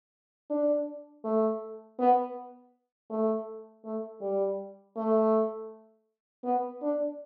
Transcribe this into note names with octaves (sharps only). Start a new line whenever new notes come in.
D4
A3
B3
A3
A3
G3
A3
B3
D4